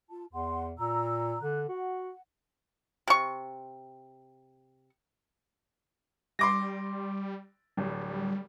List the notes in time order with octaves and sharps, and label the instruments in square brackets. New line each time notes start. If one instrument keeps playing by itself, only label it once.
[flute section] F4 A5
[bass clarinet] E2 [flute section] F#5 C6
[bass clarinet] A#2 [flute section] A#5 E6
[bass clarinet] D3 [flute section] F#6
[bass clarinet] F#4 [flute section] F#5
[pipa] C3 C#6
[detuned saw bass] G3 [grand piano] C6 D6 A#6
[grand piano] D1 [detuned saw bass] G3